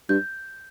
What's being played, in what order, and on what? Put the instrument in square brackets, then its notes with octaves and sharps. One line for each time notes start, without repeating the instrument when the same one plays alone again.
[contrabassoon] G2 [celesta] G6